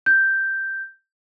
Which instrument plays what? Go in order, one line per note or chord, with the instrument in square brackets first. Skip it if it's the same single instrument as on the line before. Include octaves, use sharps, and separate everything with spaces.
[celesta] G6